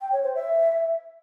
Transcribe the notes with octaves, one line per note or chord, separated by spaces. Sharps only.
G5
C#5
C5
E5